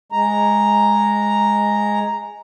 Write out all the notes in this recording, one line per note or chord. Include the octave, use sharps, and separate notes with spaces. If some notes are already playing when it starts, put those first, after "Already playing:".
G#3 A#5